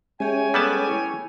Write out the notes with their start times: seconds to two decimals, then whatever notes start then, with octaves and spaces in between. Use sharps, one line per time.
0.20 G#3 C#4 G4 C#5 E5 G5 G#5
0.54 G3 B3 A4 F#5 A5 D6
0.87 E4